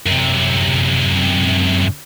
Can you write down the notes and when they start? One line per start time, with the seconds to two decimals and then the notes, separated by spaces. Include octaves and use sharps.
0.06 F#2 C3